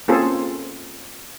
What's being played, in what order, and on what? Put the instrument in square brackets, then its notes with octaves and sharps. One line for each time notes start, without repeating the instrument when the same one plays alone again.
[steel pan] A#3 C4 C#4 F4 G#4 A4